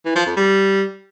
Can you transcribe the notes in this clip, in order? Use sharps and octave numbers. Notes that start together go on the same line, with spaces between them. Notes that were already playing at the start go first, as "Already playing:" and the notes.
E3
F3
F2
G3